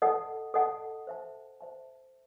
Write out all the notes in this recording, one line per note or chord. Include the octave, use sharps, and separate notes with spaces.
A4 D#5 F#5 A5
A4 D#5 F#5 A5
C5 E5 A5
C5 E5 A5